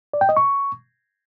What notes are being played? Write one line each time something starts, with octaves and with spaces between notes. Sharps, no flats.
D5
G5
D#5
C#6